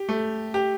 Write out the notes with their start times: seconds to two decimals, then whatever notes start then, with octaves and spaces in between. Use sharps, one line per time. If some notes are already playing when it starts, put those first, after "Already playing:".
Already playing: G4
0.09 A3
0.54 G4